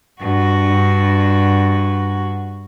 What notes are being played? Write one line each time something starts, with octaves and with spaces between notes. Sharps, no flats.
G2 F#4